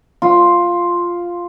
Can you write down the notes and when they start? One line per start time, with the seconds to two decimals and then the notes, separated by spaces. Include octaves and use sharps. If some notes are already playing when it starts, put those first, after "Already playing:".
0.22 F4